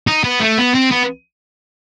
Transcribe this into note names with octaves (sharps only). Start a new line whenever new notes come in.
D#4
B3
A3
B3
C4
B3